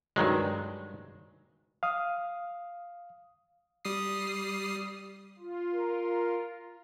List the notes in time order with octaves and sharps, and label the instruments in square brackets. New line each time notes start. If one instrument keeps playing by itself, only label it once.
[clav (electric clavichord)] G2 D#3 F#3 G#3
[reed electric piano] F5 D#6
[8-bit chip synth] G3 D#6 C7
[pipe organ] F4
[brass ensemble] A#4